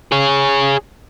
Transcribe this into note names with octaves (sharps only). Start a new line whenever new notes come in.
G#4 C#5